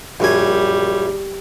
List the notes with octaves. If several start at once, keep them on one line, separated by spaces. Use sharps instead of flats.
A#1 F#2 G3 G#5